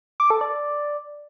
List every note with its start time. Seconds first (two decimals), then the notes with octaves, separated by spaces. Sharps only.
0.20 D6
0.30 A4
0.41 D5